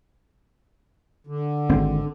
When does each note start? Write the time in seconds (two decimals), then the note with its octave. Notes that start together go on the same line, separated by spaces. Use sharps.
1.27 D3
1.69 G#1 C4